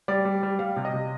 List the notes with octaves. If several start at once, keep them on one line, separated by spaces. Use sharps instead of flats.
G3 D5
G3
G3
G3 F5
C3
D#5
C3